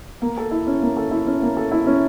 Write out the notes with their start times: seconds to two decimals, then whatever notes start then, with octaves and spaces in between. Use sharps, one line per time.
0.22 A#3
0.37 A4
0.51 E4
0.67 C#4
0.82 A#3
0.97 A4
1.11 E4
1.27 C#4
1.42 A#3
1.57 A4
1.71 E4
1.86 C#4